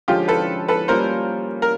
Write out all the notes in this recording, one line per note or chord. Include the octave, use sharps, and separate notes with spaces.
D3 F3 G#3 C#4 F4 G4
A4 B4
A4 B4
G3 A#3 C#4 F4 A#4 C5
A#4